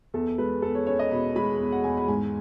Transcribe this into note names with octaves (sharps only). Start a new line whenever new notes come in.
E2 A4
G#3 B4
E2 A4
C#5
C#4 C#5
D#5
B2 B5
G#3 B5
E2
F#5
E2 G#5
B5
G#2 G#5